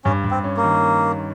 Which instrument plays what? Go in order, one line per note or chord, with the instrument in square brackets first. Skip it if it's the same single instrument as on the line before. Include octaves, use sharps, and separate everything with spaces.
[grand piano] G2 [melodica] C#4
[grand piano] G2
[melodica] C4
[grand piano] C#4
[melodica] A#3
[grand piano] D#3